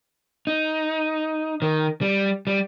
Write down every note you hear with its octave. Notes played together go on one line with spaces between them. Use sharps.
D#4
D#3
G3
G3